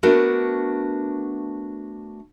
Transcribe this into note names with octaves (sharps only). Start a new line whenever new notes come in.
A3 B3 D4 F#4 A#4